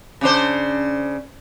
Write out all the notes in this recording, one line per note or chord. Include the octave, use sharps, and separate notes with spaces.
C#3 D4 C5